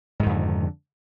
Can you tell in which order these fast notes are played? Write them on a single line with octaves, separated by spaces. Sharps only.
G#2 D#3 F2 D3